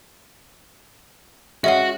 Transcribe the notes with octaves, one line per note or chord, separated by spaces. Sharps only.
G#3 C#4 F#4 D#5 E5 F#5